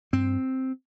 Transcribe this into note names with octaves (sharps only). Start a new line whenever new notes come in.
G2 C4